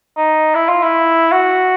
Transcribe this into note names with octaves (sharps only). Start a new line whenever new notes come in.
D#4
E4
F4
E4
F#4